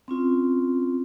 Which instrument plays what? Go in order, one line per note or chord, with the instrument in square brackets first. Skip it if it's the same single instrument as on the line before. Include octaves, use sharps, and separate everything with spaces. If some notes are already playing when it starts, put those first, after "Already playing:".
[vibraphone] C4 C#4 F4